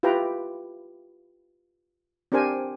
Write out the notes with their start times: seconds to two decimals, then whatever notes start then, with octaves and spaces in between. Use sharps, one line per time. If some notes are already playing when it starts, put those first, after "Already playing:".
0.03 E4 F4 G4 B4 G5 A#5
2.32 C4 D4 G4 A#4 C5 G#5